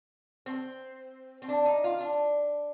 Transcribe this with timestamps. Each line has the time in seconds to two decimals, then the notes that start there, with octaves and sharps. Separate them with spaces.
0.46 C4
1.42 C4
1.48 D4
1.66 D#4
1.84 F4
2.01 D4